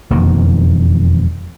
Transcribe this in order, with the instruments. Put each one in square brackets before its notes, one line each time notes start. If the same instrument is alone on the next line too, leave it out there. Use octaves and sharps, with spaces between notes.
[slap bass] E1 F2 D#3 A#3